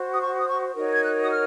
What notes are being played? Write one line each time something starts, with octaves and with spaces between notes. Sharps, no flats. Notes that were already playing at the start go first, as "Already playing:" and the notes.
Already playing: F#4 C5
D#6
C#6
D#6
C#6
D#4 F#4 A#4 C#5
G#6
F#6
D#6
F6